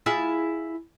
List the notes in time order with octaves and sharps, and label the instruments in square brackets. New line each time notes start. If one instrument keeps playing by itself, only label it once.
[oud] E4 F4 G#4